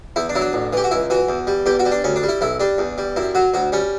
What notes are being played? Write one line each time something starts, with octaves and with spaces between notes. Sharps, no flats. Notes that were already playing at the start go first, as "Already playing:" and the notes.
E2 E4
D4
F#3 E4
D4
A1
E3 G4
F#4
C#2 E4
E3 F#4
E2
G3
E2 G4
F#4
G3
D4
D2 C#4
D4
G3
E4
B1 E4
G3 D4
E2
G3
F#2 E4
F#3 F#4
D2 F#4
G3 C#4